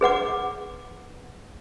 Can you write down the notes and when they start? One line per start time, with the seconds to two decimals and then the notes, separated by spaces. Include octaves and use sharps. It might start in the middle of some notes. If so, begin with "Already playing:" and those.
0.01 G#4 B4 F#5 D6